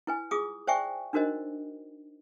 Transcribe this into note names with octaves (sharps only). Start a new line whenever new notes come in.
E4 B4 G#5
F4 G#4 D6 D#6
C5 D5 E5 G5 G#5 C#6
D4 D#4 F#4 A#4 C5 D#5